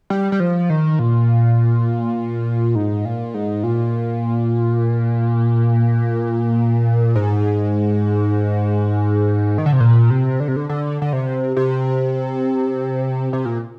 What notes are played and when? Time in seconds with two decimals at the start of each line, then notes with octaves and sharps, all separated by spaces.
0.10 G3
0.32 G3
0.40 F3
0.70 D#3
0.99 A#2
2.75 G#2
3.05 A#2
3.34 G#2
3.63 A#2
7.16 G#2
9.58 D#3
9.66 D3
9.73 C3
9.80 A#2
10.10 C3
10.40 D3
10.48 C3
10.56 D3
10.69 D3
11.02 D3
11.13 C3
11.57 C3
13.33 C3
13.45 A#2